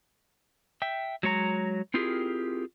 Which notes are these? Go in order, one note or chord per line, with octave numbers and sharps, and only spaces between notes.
E5 G5
F#3 G#3 C#5 A#5
C4 E4 F4 G4 G#4 A#4